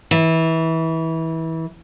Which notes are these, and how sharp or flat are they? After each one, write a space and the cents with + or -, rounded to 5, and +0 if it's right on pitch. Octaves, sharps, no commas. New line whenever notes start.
E3 -25